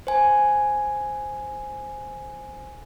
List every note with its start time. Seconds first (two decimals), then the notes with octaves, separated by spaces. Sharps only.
0.07 C5 G#5